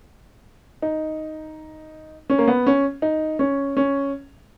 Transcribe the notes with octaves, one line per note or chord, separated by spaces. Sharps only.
D#4
C#4
A#3
B3
C#4
D#4
C#4
C#4